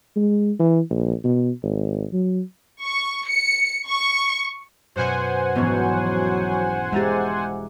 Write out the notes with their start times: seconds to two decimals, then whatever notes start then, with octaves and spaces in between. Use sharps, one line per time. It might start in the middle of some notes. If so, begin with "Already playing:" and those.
0.16 G#3
0.59 E3
0.90 A#1
1.24 B2
1.63 G#1
2.13 F#3
2.81 C#6
3.27 C#7
3.88 C#6
4.96 F#2 B2 C5 F#5 G#5
5.55 E1 G#2 F3 F#3 B3 C#4
6.92 G#3 G4 E5 A#5 A6